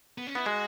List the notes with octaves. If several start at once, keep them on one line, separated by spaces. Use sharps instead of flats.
B3
C#4
B3 E4
G#3 F#4